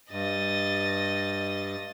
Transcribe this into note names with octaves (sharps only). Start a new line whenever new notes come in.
G2 D#5 A6